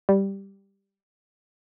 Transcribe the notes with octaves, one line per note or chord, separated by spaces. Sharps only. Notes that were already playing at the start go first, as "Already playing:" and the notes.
G3